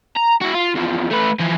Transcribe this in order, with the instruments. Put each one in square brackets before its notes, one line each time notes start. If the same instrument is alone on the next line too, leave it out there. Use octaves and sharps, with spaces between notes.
[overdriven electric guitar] A#5
E4 F#4
F4
E2 F3
A3 B4
E3 F3